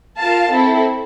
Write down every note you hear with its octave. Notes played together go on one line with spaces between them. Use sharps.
F4 A#4 F5 A5
C4 E4 A4